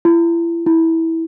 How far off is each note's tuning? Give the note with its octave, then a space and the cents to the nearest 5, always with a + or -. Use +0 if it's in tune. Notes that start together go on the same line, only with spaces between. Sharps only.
E4 +35
E4 -15